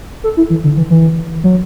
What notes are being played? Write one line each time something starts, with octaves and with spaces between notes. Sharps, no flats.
A4
E4
E3
D3
E3
E3
F#3